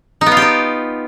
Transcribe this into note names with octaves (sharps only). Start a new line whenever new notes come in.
D#4
B3
F4
G4
D#4